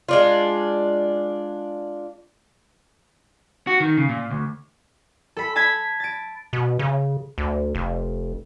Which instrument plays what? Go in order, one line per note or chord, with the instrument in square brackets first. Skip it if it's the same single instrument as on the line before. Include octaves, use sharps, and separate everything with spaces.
[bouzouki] G#3 D4 F4
[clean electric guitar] F#4
D#3
C#3
A#2
D2
[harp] A4 B5
A5 B5 G#6 B6
A6 D7
[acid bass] B2
C#3
D2
F1